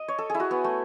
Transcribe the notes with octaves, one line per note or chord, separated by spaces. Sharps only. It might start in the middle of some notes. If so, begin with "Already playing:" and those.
Already playing: D#5
C#5
A4
E4 G#4
F#4
B3
A3